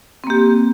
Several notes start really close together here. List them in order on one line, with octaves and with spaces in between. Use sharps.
C4 A#3 G4